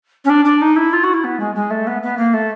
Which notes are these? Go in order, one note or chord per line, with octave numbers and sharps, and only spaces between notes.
C#4
D4
D4
D#4
E4
F4
F#4
E4
B3
G#3
G#3
A3
B3
B3
A#3
A3